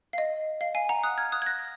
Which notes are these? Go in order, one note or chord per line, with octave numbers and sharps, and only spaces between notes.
F5
D#5
F5
F5 G#5
F#5 A#5
D#6 F#6
F6 G#6
D#6 F#6
G#6
F#6 A#6